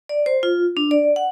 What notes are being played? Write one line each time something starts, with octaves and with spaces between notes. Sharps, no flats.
D5
C5
F4
D4
D5
F#5